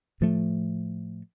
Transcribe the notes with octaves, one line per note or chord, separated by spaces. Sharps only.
A2 F3 A3